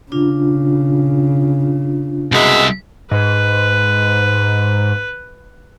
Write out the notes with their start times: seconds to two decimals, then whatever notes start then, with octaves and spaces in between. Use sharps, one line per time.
0.12 C#3 D4 F4
2.32 C2 F#2 B2 G#3 E5
3.11 G#2 B4